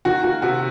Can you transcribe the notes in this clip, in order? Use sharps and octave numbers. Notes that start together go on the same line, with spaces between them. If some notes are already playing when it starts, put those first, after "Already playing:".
D#3 F#4
A#3 F#4
C3 F#4